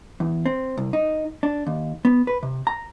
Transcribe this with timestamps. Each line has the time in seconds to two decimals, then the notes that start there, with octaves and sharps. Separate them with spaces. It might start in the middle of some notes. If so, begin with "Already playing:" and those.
0.20 E2
0.46 C4
0.77 C2
0.93 D#4
1.43 D4
1.67 D#2
2.05 B3
2.27 B4
2.43 C3
2.67 A#5